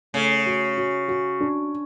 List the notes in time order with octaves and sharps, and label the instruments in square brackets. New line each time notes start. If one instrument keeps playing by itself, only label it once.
[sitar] C#3 [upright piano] A3
[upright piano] F#4
F#4
F#4
D4